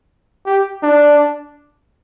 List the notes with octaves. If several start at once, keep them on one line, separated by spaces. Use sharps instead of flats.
G4
D4